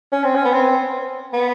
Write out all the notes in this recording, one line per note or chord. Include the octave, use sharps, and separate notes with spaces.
C#4
C4
C#4
B3
C4
B3